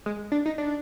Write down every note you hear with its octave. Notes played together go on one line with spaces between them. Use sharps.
G#3
D4
D#4
D4